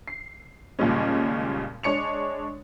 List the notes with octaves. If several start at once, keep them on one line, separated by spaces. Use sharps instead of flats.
C7
D#2 A#2 C#3 G3 G#3 C#4
G#3 D4 C#5 C#7 F7